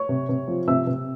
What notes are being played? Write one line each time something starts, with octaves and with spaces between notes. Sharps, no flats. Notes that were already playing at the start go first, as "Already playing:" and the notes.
Already playing: C#5 C#6
C3
C3
F3
C3 E5 E6
C3